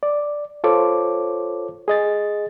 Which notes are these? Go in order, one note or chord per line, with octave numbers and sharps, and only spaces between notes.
D5
F4 A4 C5 C#5 D6
G#4 D#5 A6